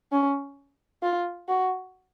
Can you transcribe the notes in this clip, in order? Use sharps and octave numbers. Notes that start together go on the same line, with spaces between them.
C#4
F4
F#4